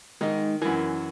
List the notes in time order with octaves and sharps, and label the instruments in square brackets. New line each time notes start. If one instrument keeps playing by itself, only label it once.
[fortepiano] D#3 [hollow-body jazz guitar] G#3 D#4 D#5
[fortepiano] F#2 E3 [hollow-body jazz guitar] A#4 G#5